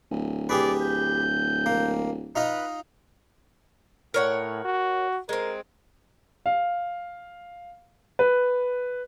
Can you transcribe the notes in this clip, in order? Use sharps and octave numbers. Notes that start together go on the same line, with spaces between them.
D1
G4 G#4 B4 D5
G6
A#3
D#4 F4 B4 D#5
A2 A#4 C#5 F#5
F#4
G#3 C4 A#4
F5
B4